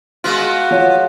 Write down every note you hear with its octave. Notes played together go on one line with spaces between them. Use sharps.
G#3 B3 F4 F#4
F3 C#5 F#5